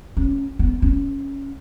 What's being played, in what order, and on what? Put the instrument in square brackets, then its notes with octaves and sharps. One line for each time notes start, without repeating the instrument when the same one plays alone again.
[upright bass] C#4
B3
C#4